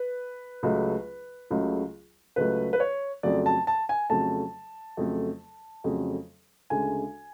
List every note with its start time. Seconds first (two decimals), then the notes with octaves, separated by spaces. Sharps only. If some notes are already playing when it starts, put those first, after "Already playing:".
Already playing: B4
0.63 C#2 C#3 F#3 A3
1.50 C#2 C#3 F#3 A3
2.36 C#2 C#3 F#3 A3 B4
2.73 B4
2.80 C#5
3.23 F2 C#3 F#3 A3 D5
3.46 A5
3.67 A5
3.89 G#5
4.10 F2 C#3 F#3 A3 A5
4.97 F2 C#3 F#3 A3
5.84 F2 C#3 F#3 A3
6.70 D2 C#3 G#3 G#5